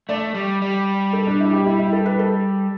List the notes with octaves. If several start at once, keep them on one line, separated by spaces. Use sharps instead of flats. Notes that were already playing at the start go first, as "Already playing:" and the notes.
A3 D5
G3
G3
A4
D4
E4
G4
E4
E4
A4
B4
A4